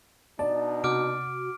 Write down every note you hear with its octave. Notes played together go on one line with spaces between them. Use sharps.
B2 D4 D#4 D5 A5
C3 F#4 D6 F6 D7